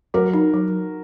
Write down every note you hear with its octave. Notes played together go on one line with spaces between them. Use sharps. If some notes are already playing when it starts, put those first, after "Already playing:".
F#3 F#4 A#4
D#4
F#3